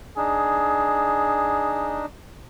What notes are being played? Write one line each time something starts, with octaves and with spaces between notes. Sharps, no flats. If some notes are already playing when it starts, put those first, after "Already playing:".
D4 D#4 G#4